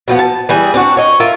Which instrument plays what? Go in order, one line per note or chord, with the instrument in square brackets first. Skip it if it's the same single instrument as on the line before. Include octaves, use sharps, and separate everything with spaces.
[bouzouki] B2 F3 B3
A5
E3 G3 G#4
C4 D4 F#4
C#5 D#5
F4 A#4 E5